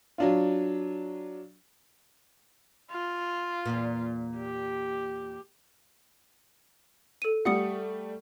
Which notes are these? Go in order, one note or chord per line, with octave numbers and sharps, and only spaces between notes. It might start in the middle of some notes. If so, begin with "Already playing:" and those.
F#3 D4 F4
F4
E2 A#2
G4
A4 D#7
G3 A3 F#5 D#6 C#7